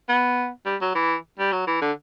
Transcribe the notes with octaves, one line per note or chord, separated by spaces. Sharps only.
B3
G3
F#3
E3
G3
F#3
E3
D3